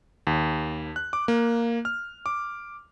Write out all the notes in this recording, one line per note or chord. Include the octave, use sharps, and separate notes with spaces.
D#2
F#6
D6
A#3
F6
D6